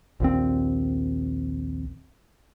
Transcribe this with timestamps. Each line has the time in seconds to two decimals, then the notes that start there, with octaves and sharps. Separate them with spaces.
0.20 A#1 D#2 C4